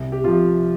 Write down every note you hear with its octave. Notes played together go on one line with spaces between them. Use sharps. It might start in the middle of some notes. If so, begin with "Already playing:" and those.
Already playing: C2
G4
C3 F3 F4